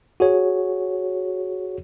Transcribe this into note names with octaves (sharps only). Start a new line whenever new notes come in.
F#4 G#4 C#5